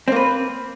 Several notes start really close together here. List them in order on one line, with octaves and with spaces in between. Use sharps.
C4 A#3 B4